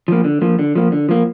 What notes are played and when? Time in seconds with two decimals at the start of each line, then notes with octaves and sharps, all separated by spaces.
0.08 F3 A#3
0.24 D3
0.42 F3 A#3
0.59 D3
0.75 F3 A#3
0.92 D3
1.09 F3 A#3